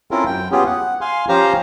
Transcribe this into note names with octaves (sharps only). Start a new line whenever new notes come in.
C4 C#4 E4 F4 A4 A#4
F#2 G5
B3 C#4 F4 G4 G#4
F#5
F5 G#5 C6
F3 C#4 G4 C5 F5 A#5